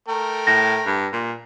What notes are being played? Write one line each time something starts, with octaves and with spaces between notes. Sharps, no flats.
A3 A#4 G5
A2 A#6
G2
A#2